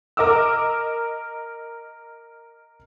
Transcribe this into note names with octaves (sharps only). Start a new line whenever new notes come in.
A#4 D#5 D6 E6